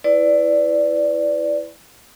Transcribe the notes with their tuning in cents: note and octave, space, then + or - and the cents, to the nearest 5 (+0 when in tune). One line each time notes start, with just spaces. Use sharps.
E4 +0 B4 +30 D5 -5